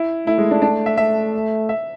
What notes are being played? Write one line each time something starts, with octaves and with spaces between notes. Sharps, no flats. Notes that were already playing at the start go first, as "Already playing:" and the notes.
Already playing: E4
A3 E4
G#3
D4
D4
E5
A3 E5
E5